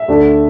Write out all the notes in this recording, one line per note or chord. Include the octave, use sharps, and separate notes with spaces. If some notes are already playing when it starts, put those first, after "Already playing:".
Already playing: E5
D2 D3 A3 D4